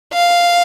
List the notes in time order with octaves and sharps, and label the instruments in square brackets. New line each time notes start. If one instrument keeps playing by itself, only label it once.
[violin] F5